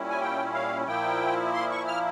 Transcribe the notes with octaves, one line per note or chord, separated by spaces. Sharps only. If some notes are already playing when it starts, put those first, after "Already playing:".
Already playing: A#2 G3 C#4 E4
G#5
G5
F5
A#2 F3 A#3 E4 G5
C6
C#6
F6